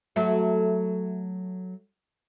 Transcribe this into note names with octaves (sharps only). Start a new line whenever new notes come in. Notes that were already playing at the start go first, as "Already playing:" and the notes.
F#3 A3